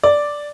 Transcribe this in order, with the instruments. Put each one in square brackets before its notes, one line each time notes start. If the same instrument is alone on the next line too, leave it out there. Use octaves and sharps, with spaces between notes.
[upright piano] D5